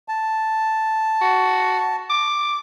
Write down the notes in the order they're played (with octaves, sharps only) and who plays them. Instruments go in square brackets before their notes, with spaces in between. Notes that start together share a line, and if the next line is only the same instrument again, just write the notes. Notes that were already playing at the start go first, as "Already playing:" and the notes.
[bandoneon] A5
[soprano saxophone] F#4
D6